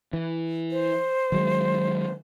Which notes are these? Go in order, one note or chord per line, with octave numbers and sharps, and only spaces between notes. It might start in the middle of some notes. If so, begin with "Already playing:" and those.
E3
C5
D#3 F#3 G#3